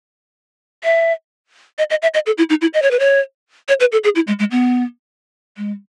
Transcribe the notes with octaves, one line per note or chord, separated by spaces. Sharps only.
E5
D#5
D#5
E5
D#5
A4
E4
D#4
E4
D#5
C#5
B4
C#5
C#5
B4
A4
G#4
E4
G#3
G#3
B3
G#3